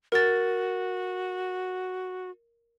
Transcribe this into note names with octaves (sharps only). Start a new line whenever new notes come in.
F#4 A#4 A6